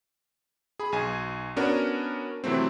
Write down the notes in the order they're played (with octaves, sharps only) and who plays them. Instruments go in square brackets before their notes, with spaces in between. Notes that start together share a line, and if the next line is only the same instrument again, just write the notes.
[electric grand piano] G#4 B5
B1 G#5
B3 C#4 D4 F#4 A#4
C3 E3 F#3 A3 C4